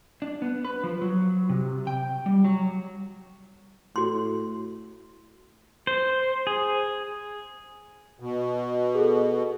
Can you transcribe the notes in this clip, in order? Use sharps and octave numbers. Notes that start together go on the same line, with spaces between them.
D4
B3
B4
F3
F#3
C3
G5
G3
F#3
A2 F#4 C6
C5
G#4
B2
G#4 A4